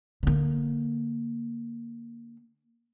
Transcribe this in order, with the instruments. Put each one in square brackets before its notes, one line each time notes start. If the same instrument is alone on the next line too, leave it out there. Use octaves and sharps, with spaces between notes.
[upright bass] D3 A#3